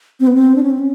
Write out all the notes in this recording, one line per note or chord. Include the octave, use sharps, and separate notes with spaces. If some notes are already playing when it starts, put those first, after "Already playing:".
C4
B3
C4
D4
C#4
C4
C#4